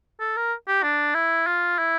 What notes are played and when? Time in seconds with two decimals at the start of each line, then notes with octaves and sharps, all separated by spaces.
0.20 A4
0.37 A#4
0.68 G4
0.83 D4
1.15 E4
1.46 F4
1.78 E4